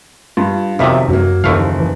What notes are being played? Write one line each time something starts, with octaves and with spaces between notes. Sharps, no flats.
G2 F4
B1 F2 C3 D#3 E5
F#2 F#3 A#3
F#1 D#2 E3 F3 A3 F5
E3